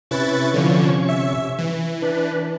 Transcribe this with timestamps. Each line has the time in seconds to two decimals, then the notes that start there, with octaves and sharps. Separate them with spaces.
0.11 C3 C#4 E4 B4 C#6 A6
0.54 D3 F3
1.09 E5
1.59 E3
2.02 D4 B4